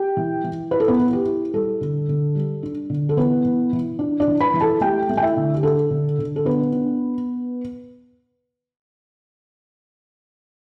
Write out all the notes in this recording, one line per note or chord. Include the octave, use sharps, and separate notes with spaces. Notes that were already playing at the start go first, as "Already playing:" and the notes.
Already playing: G4 G5
E3
E3
E4 B4
A4
B3 B4
E4
G4
E4
G3 A4
D3
D3
G3
D4
D3
A4
E3 B3 B4
E3
E3
D4
D4 D5
E3
B4 B5
E3
A4 A5
A3 G4 G5
A3
G5
E4 E5
D3
G4
D4 A4
D3
D3
A4
B3 D4 B4
D4